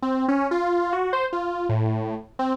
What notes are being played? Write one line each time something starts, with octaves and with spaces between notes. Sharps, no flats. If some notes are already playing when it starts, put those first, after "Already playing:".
C4
C#4
F4
F#4
C5
F4
A2
C4